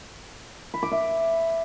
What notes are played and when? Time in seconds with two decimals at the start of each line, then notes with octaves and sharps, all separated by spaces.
0.74 B5
0.83 D6
0.92 E5